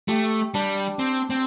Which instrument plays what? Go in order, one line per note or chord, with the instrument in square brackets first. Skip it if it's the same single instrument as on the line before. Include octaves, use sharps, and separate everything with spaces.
[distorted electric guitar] A3 [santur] G4
[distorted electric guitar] G3 [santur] D4
[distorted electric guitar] C4
C4